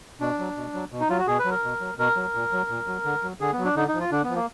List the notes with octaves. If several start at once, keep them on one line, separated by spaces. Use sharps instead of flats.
B2 D4
F#3
B2
F#3
B2
D#4
F#3 F4
F#4
B2 G#4
B4
F#3
A#4
B2
F#3
B2 A#4
F#3
A#2
F#3
A#2
F#3
D3
F#3
D3 G#4
B3
F#3
D4
D3 D#4
D#4
F3
F4
D3 D4
B3
F3
A#3